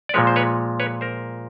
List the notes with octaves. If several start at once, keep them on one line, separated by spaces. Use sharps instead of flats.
D5
A#2 F3 G#3 B4 C#5
C5
B4 C#5
B4 C#5
A#4 C5